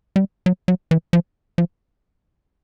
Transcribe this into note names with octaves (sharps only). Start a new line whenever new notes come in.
G3
F#3
F#3
E3
F3
F3